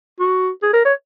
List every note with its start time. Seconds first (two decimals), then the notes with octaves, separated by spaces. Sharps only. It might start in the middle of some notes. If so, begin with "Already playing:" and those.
0.20 F#4
0.63 G#4
0.73 A#4
0.85 C#5